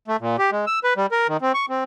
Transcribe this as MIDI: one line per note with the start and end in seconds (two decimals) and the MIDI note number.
0.08 0.17 57
0.20 0.36 46
0.39 0.50 67
0.52 0.65 56
0.67 0.79 88
0.84 0.94 71
0.97 1.06 55
1.12 1.27 70
1.28 1.37 51
1.42 1.52 60
1.54 1.66 85
1.69 1.84 60